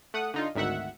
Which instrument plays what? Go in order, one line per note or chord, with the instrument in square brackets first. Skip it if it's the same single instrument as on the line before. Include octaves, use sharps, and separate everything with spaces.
[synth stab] A3 F#5 D#6
D3 D#4 F4
G#1 D2 D#3 E5 F#5